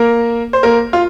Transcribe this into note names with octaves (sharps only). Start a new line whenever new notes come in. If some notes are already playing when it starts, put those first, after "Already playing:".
Already playing: A#3 A#4
C5
A#3 A#4
F4